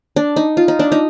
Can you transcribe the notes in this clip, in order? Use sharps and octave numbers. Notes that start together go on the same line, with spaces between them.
D4
D#4
F4
D#4
D4
D#4